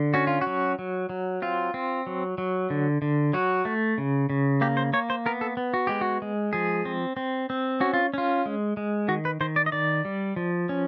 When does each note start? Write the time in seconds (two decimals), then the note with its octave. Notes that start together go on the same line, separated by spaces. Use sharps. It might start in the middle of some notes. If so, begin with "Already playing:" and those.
Already playing: D3
0.14 C#4 F#4
0.27 F4
0.41 F#4
0.47 F#3
0.79 F#3
1.09 F#3
1.42 C4 F4
1.74 C4
2.07 F#3
2.38 F#3
2.70 D3
3.02 D3
3.33 F#3 F#4
3.65 A3
3.98 C#3
4.30 C#3
4.61 A#3 G4
4.77 C5
4.93 A#3 C#5
5.10 C5
5.26 B3 A#4
5.41 A4
5.57 B3
5.74 F#4
5.87 G#3 G4
6.01 F#4
6.22 G#3
6.53 F3 G#4
6.85 C4
7.17 C4
7.50 C4
7.80 C#4 F#4
7.94 F4
8.14 C#4 F4
8.46 G#3
8.77 G#3
9.08 D#3 F#4
9.25 B4
9.41 D#3 C5
9.56 D5
9.66 D#5
9.72 D#3 D5
10.05 G3
10.36 F3
10.69 C#4